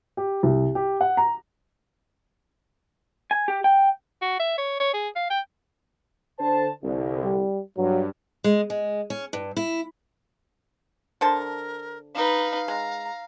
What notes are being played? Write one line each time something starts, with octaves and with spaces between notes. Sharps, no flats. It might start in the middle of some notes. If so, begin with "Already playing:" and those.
G4
C2
G4
F#5
A#5
G#5
G4
G5
F#4
E5
C#5
C#5
G#4
F5
G5
D3 C5 A5
C2 D3
G3
G2 F#3
G#3
G#3
C#4
G2
E4
D3 A#4 C5 A5
D#4 B4 F5
G#3 A#5